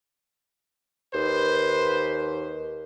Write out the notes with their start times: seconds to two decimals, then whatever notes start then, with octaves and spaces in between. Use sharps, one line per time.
1.14 D#2 B4 C5